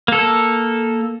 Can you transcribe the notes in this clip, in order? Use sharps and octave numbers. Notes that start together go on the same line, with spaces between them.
A#3 A4